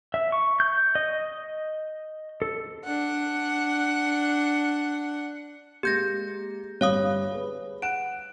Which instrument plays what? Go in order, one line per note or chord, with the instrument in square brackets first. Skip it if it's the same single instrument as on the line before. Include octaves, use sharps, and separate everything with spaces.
[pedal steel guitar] E5
C#6
G6
D#5
A4
[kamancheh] D4 F#5
[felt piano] G#3 A#3 [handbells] G4 G6 A#6
[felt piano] G1 G3 [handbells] C#5 F5 D#6
[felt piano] G#4 B4
[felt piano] F#5 F#6 E7 [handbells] D7